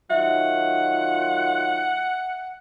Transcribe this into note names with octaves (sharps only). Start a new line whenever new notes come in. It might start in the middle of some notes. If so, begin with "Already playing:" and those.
D#3 F#3 F4 E5 F#5